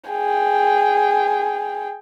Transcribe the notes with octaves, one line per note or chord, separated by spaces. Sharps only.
G#4 G5